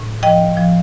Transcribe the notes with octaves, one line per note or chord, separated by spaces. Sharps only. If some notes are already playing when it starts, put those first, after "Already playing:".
Already playing: A2
F3 D#5 G5
F3